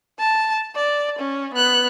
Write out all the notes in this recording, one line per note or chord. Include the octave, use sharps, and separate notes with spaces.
A5
D5
C#4
B3 F#6